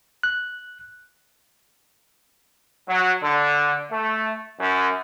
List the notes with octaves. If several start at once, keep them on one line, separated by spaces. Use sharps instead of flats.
F#6
F#3
D3
A3
F#2